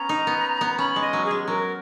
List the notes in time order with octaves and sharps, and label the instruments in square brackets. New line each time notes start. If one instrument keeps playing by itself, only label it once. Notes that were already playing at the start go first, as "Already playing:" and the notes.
Already playing: [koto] B3 C#4 [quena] A#5
[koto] D#4
B3
B3
[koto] C#4 [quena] B5
[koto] G#3
[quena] D#5
[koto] F#3
[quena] G#4
[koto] G#3
[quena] G#4
[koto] F#3 [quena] A#4